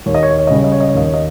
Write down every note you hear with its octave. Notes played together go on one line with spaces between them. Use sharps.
D#2 C#5
D#5
C#5
D#5
C#5
D#5
C#3 G3 C#5
D#5
C#5
D#5
C#5
D#2 D#5
C#5
D#5